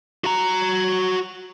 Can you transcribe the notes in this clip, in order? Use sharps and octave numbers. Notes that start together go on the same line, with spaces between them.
F#4 A#5